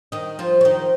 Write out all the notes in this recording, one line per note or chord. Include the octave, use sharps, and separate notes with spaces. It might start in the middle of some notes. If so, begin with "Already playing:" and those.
D#3 D#4
F3 F4
C#4
D#3 D#4